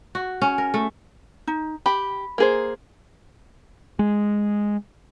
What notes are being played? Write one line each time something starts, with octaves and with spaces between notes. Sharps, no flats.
F#4
C#4
A#4
A3
D#4
G4 B5
A#3 G#4 C5
G#3